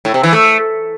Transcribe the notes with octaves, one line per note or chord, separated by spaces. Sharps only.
A2
C3
E3
A3